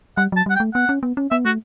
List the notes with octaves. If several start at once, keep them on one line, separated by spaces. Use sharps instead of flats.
G3 F#5
F#3 A5
G3 F#5
G5
A3
B3 F#5
C#4
B3
C#4
B3 E5
A3 F#4